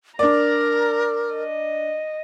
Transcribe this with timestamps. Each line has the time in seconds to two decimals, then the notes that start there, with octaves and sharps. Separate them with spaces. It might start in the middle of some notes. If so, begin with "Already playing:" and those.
0.19 D4 A#4 D5 A#5
1.34 D#5